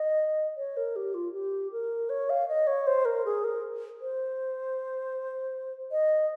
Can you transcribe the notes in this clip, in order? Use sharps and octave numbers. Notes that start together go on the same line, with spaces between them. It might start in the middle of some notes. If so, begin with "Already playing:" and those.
Already playing: D#5
C#5
A#4
G4
F4
G4
A#4
C#5
F5
D#5
C#5
C5
A#4
G#4
A#4
C5
D#5